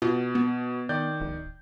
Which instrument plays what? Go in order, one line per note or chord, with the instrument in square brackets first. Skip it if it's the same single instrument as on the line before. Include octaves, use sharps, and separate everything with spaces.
[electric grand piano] B2 [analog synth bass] F4
[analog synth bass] B3
[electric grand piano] D#3 D5 G6
[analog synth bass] D1